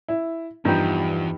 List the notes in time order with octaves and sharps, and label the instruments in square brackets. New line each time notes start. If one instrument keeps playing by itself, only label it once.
[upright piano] E4
[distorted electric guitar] E2 [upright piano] G2 F3 [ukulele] D#4 G4